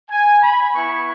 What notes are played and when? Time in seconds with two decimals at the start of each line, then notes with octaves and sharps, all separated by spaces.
0.11 G#5
0.42 B5
0.74 B3 E4 C#6